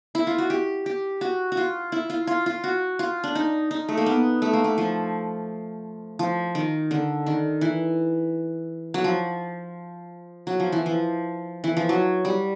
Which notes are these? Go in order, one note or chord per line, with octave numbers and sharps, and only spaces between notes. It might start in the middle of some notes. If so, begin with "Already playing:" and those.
E4
F4
F#4
G4
G4
F#4
F#4
F4
E4
F4
F4
F4
F#4
F4
D4
D#4
D#4
A3
A#3
B3
A3
A#3
A3
F3
F3
D#3
D3
D#3
E3
F#3
F3
F#3
F3
E3
F3
E3
F3
F#3
G3